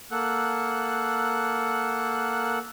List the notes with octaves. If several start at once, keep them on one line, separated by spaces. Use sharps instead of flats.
A#3 A4 F#5 F#6